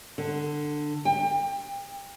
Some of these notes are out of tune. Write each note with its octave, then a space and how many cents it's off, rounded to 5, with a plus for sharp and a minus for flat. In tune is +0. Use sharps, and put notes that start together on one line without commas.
D3 +15
G5 +30